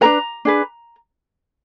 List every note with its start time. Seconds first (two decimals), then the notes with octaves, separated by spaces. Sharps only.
0.01 D4 G#4 B4 A#5
0.45 D4 G#4 B4